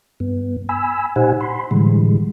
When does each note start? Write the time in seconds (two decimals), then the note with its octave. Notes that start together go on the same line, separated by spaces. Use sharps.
0.20 G2 B3
0.69 G#5 B5 E6
1.16 A#2 D#4 G4 C5 F#5 G#5
1.41 B5 C6
1.71 A2 D3 E3 G3 G#3